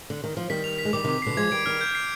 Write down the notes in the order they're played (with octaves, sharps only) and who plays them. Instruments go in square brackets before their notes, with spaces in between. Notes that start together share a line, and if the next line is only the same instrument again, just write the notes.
[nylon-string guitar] D3
D#3
F3
[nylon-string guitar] D#3 G3 [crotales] B6
[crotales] F7
B6
[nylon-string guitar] G#3
[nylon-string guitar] D#3 G3 [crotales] D6
[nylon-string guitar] C3 D#3 [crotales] D6
[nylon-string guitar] B2 D3 [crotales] C7
[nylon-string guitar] F3 G#3 [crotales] G#6
[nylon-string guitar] D#3 G3 [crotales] D7
[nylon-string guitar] D#3 G3 [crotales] F6
[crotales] G6
C7